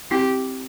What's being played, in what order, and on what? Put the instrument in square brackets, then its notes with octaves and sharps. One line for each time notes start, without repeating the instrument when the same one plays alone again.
[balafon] C4 E4 [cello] G4